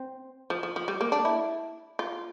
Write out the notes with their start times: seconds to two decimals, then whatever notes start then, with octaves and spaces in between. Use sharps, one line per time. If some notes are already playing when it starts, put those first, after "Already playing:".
Already playing: C4
0.50 F3
0.63 F3
0.76 F3
0.88 G3
1.01 A#3
1.12 D4
1.25 E4
1.99 F4